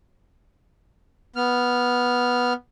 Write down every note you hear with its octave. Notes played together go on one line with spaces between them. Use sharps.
B3 F6